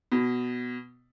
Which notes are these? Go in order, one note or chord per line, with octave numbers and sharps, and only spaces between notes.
B2